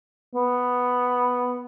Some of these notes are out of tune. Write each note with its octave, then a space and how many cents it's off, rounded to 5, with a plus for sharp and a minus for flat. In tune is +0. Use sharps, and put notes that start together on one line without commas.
B3 +0